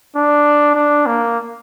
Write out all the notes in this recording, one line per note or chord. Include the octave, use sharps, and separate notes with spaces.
D4
D4
A#3